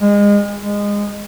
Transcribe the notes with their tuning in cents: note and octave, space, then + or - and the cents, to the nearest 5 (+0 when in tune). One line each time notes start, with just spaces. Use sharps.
G#3 -30
G#3 -20